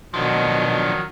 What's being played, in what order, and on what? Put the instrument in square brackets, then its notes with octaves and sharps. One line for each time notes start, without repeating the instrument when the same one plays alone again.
[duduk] B2 [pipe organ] D#3 F#3 [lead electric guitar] F3 D4